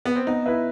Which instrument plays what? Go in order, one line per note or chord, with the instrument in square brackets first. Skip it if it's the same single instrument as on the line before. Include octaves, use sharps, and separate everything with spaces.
[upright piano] B3
C4
[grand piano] B3 [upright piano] D#4
[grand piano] E4 B4 E5